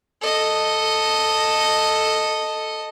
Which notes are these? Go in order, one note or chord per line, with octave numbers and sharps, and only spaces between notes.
A4 D#5